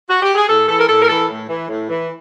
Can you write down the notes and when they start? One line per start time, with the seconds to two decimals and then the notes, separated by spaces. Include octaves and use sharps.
0.09 F#4
0.22 G4
0.35 G#4
0.47 A2 A4
0.68 E3 A4
0.79 A#4
0.87 A2 A4
1.02 A#4
1.08 E3 A4
1.28 A2
1.48 E3
1.68 A2
1.88 E3